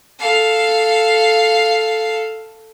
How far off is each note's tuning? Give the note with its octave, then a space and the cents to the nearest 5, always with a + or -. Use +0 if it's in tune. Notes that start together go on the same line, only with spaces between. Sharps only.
A4 +0 F5 +0